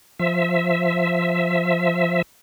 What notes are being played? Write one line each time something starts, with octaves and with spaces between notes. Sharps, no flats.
F3 E5